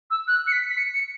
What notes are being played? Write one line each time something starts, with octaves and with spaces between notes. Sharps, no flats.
E6
F#6
C#7
B6
B6
C#7
C#7